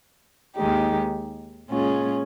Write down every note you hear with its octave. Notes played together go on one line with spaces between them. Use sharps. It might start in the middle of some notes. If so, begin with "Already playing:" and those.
D#2 D#3 G#3 D#4 G4
A#2 G#3 C#4 F4 G#4